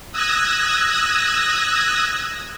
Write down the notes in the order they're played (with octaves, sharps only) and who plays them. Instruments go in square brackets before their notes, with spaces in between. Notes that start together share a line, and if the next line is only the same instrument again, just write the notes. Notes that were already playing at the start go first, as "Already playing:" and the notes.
[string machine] D#6 E6 F#6 G#6 A#6